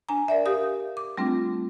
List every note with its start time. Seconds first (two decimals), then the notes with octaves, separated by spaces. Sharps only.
0.09 D4 G#5 A#5
0.28 A#4 D5 E5
0.46 G4 A#4 F5 D#6
0.97 D6
1.17 G3 A3 C4 D4 F4